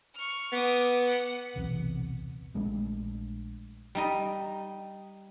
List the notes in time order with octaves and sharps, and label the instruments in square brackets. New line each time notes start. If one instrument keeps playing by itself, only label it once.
[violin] C#6 F6
[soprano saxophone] B3 [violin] D6 D#6
[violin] F#5
[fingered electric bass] D#1 B1 E2 C3
A#1 G#3 A3 D4
[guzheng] G3 D#4 D#5